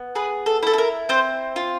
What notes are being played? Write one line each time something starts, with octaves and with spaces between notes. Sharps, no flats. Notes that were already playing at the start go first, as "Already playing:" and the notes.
Already playing: B3
G#4 B4
A4
E4 A4
A4
A#4
C4 C5
F4